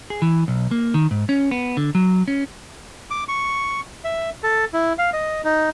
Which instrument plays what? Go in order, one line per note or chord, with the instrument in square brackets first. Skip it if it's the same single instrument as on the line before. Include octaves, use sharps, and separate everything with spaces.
[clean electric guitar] G#4
E3
B1
A#3
D#3
G#2
C#4
B3
D3
F#3
C#4
[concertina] D6
C#6
E5
A4
E4
F5
D#5
D#4